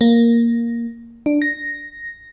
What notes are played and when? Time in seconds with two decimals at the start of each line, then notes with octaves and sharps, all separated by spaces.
0.01 A#3
1.26 D4
1.42 A#6